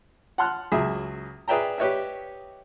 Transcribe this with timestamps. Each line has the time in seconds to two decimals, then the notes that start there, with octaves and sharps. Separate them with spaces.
0.38 F#5 A5 C6 F6 F#6
0.72 C#2 F#3 G#4 E5
1.48 G#4 B4 D5 E5 G5 A#5
1.78 G4 B4 C#5 D#5 E5